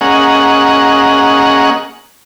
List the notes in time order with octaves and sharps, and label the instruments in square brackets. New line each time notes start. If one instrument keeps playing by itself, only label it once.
[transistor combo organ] A#3 C#4 G#4 D#5 F#5